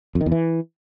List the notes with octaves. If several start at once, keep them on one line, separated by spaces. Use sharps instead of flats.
F2
D#3
E2
E3